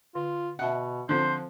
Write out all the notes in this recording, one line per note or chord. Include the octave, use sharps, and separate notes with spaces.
D3 F4
B2 D#5 E5 F#5 A5
D3 F3 C4 F4 A4 C5